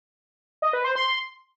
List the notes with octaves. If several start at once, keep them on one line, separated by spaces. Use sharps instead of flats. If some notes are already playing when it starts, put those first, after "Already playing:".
D#5
B4
C5
C6